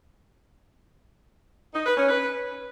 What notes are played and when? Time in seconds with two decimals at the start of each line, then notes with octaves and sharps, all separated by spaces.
1.74 D#4
1.86 B4
1.97 C#4
2.09 B4